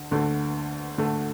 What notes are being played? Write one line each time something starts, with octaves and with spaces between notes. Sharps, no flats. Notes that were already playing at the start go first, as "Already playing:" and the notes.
Already playing: D2 D3
D2 D3 A3
D2 D3 A3